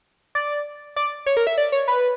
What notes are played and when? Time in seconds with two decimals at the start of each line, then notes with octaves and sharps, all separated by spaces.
0.35 D5
0.96 D5
1.26 C#5
1.37 A#4
1.47 E5
1.58 D5
1.72 C#5
1.88 B4